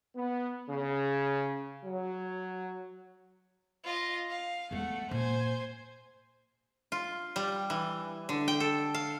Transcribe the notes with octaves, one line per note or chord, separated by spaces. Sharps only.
B3
C#3
F#3
F4 D#5
F5
E2 G#3 A3 F#5
A#2 C5 G#5
F4
G3
E3
D3
G5
A4
F5